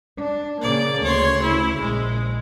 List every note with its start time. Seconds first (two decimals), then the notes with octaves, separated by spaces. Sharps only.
0.18 D4
0.62 C#3 A#3 D5
1.04 D2 C#3 C#5 C6
1.43 E4
1.80 A#1 G#3